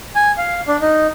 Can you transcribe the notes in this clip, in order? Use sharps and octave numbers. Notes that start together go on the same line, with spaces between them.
G#5
F5
D4
D#4